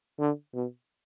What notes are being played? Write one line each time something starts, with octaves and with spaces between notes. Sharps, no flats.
D3
B2